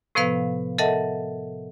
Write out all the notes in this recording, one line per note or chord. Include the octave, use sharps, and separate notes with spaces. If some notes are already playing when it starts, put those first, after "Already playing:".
A2 C3 F3 B3 B4 F5
A4 A#4 D#5 E5 F#5 A5